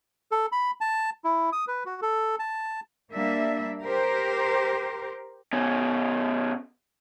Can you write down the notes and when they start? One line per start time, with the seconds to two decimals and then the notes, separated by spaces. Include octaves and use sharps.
0.32 A4
0.52 B5
0.81 A5
1.24 E4
1.53 D#6
1.68 B4
1.86 F#4
2.02 A4
2.39 A5
3.13 G3 A#3 D4 E5
3.83 G4 A#4 C5
5.53 B2 C#4